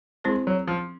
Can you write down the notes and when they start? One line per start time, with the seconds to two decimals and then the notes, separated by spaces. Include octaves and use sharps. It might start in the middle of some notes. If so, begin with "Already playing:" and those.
0.24 G#3 C4 E4 G#4 C5
0.47 F#3
0.68 F3